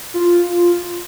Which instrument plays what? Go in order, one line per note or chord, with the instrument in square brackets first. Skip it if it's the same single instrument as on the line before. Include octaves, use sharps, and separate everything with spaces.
[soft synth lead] F4